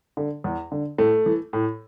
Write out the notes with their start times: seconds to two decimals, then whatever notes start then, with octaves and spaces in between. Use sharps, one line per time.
0.17 D3
0.44 E2
0.72 D3
0.98 A2 A3
1.26 E3
1.53 A2